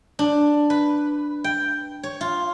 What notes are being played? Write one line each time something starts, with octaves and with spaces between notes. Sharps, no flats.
D4
B4
G5
C#5
F4